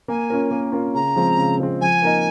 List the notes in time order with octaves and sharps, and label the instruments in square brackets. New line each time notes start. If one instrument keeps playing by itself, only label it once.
[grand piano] A#3 [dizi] G#5
[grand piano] C#4 F4 A#4
A#3
C#4 F4 A#4
[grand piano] C#3 [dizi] A#5
[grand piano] F3 G#3 C4
C#3
F3 G#3 C4
[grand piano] F3 [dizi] G#5
[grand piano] A#3 D#4 A#4 D#5